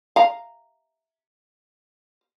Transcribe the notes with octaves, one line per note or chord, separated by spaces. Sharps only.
F5 A#5